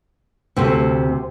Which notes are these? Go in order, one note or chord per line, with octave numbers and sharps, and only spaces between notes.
D2 C3 A3